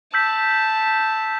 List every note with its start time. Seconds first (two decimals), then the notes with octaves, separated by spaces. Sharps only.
0.14 A5 E6 G6 B6